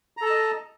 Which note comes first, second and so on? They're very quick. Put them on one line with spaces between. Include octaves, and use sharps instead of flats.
A#5 A4 A5 D#5